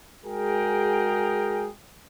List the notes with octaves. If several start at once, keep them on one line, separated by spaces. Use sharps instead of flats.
G#3 F#4 G#4 A#4 G5